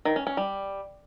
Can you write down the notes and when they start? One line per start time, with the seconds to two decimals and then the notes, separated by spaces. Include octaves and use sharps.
0.05 D#3
0.16 C#4
0.27 C#4
0.37 G3